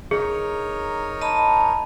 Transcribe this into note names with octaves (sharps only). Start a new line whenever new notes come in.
D#4 G#4 A#4 C#5
D#5 A5 B5